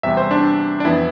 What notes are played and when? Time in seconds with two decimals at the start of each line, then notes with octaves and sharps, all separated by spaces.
0.03 E2 C3 G3 C4 E5
0.17 C5
0.31 D4
0.80 D4
0.85 F2 E3 B3 E4